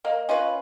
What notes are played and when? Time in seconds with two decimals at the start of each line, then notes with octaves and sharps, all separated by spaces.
0.04 A#3 D#5
0.29 C#4 F4 B4 D#5